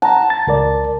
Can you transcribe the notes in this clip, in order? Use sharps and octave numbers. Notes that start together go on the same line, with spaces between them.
F#5 A5 A#5
A6
C#2 A#4 D5